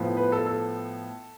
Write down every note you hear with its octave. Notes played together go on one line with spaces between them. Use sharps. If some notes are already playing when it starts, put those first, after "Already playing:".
Already playing: A2 F3 B3
B4
A4
A4